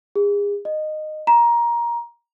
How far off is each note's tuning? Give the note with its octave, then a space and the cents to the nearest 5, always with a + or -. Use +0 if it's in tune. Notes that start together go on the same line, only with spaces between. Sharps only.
G#4 -35
D#5 -15
A#5 +15